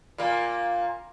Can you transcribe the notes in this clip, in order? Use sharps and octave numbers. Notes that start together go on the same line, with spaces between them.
A#2 A#3